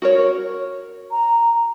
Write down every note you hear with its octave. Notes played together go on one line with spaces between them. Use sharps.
F#4 A#4 C#5
A#5